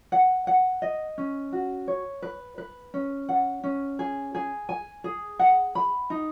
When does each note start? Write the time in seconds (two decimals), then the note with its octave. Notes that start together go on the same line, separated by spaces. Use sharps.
0.12 F#5
0.47 F#5
0.82 D#5
1.18 C#4
1.52 F#4
1.88 C#5
2.22 B4
2.58 B4
2.94 C#4
3.29 F#5
3.63 C#4
3.99 G#4
4.35 G#4
4.69 G#5
5.04 G#4
5.39 F#5
5.75 B5
6.10 D#4